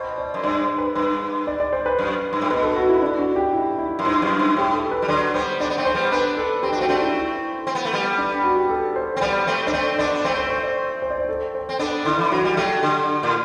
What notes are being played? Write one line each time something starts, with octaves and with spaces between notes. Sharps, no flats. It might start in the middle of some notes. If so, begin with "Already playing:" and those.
Already playing: B2 C5
D5
F#2
G2 D5
C5
B4
G2 B4
D5
D5
C5
B4
F#2
G2
A2
B2 B4
A4
F#4
E4
D4
F#4
G4
E4
E4
F#2
G2
F#2
G2
A2 G4
A4
B4
G3
D3 F#3 D5
G3 B3 C5
B3 D4 D5
B3
A3 C4
C5
G3 B3
B3 D4 B4
A4
C4 G4
D4
A3 C4 F#4
A3 C4 D4
E4
E4
C4
B3
A3
G3 B3
D4
F#4
G4
A4
C5
C4
G3 B3 D5
A3 C4
D4 C5
A3 C4 D5
B3 D4 D5
B3
A3 C4 C5
C5
C5
D5
C5
D5
C5
A4
C5
C4
B3 D4 A4
D3 E4
E3
F#3 F#4
G3
F#3 A3 G4
D3
A2